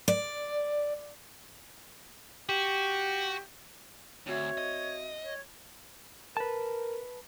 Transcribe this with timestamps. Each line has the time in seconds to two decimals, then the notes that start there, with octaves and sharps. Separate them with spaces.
0.08 D5
2.49 F#4 G4
4.27 D2 C4 F#4 C#5 E5
4.58 D#5
5.24 C#5
6.37 A#4 B4 A5